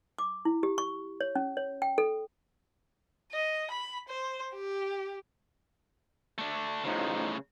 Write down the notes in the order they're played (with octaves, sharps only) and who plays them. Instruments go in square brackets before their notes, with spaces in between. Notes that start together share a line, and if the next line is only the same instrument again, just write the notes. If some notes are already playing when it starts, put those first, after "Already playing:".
[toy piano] D6
E4
G4
C#6
C#5
C#4
C#5
G5
A4
[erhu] D#5
B5
C5
G4
[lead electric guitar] A3 D4
[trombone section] A1 F3 D#4 [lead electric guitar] A2 C#3